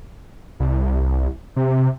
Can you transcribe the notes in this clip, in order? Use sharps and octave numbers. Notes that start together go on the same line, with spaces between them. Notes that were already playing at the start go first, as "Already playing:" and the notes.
C2
C3